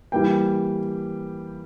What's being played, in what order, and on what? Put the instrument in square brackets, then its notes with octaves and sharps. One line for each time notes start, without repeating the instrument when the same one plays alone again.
[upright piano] E3 G3 A#3 G5